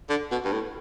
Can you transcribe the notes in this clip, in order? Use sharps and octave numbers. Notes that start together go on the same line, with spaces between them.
D3
B2
G2
A2